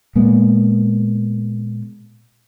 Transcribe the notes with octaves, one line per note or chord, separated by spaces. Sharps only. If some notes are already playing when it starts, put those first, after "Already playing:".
A#2 G#3 A#3 B3